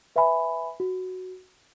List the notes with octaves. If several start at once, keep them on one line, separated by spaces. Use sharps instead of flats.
B4 E5 G#5 B5
F#4